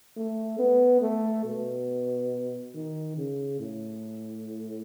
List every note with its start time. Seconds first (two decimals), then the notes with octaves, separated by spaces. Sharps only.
0.16 A3
0.59 B3
1.01 A3
1.45 B2
2.74 D#3
3.17 C#3
3.60 A2